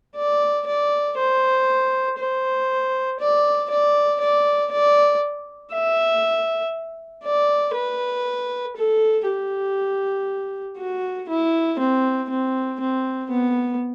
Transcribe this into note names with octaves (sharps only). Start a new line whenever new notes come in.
D5
D5
C5
C5
D5
D5
D5
D5
E5
D5
B4
A4
G4
F#4
E4
C4
C4
C4
B3